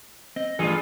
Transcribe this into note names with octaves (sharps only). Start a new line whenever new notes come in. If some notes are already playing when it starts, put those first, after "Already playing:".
C4 D#5
G2 E3 G3 A3 F4 G#4 A4